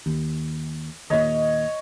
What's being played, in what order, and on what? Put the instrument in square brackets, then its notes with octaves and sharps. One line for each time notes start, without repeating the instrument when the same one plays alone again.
[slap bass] D#2
[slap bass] D#2 A#2 [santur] C#5 D#5